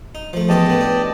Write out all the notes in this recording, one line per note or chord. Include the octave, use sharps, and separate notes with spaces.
D#4
F3 A3
E2 C#4 G4 C#5 D#5 A5
A2 B3
D4